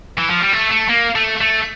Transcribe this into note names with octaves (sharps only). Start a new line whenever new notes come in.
E3
F3
G3
A3
A3
A#3
A3
A3